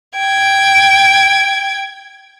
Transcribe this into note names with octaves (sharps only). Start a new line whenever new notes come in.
G5 G#6